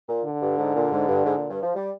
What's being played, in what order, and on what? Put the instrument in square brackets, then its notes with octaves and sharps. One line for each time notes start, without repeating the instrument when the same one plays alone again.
[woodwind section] A#2
[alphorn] D3
[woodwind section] G2
G#2
A#2
G#2
G2
G#2
A#2
G2
F3
G3